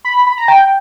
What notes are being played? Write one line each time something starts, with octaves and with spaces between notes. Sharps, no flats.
B5
B5
A#5
G5